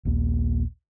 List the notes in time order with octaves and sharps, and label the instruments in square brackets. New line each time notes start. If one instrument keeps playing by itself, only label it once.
[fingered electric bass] A#1 D#2 A#3